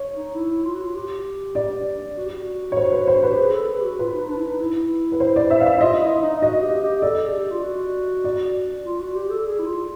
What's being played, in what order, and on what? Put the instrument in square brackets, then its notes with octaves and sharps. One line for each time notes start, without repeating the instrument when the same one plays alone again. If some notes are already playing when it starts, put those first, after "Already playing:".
Already playing: [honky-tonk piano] C#5
[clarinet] D#4
E4
F4
F#4
F4
G4
[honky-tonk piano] D5
[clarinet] F#4
G4
F#4
[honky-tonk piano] C#5
C5
B4
C5
B4
[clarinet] G4
G#4
A4
G#4
G4
F#4
[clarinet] F4 [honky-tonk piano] B4
[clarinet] D#4
D4
E4
D#4
E4
[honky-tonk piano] B4
C5
D5
E5
F5
E5
[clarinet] E4
[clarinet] F4 [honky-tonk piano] D#5
[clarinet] E4
D#4
[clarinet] F#4 [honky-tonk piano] D#5
[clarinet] G4
G4
[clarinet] A4 [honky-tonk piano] D5
[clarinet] G#4
G4
F4
F#4
[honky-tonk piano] D5
[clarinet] F4
F#4
G4
A4
G#4
E4
F4